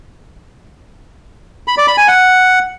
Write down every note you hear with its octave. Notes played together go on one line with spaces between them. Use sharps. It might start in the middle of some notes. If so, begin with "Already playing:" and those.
B5
D5
B5
G#5
F#5